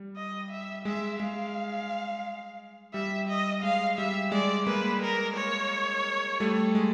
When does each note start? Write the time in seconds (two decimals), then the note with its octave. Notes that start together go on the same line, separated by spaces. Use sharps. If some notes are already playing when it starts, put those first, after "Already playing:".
Already playing: G3
0.16 D#5
0.51 E5
0.85 G#3 E5
1.20 G#3 F5
2.94 G3 E5
3.28 D#5
3.63 G#3 F5
3.98 G3 E5
4.32 G#3 D5
4.67 G#3 A#3 B4
5.02 A#4
5.36 C#5
6.40 G3 A3
6.75 G#3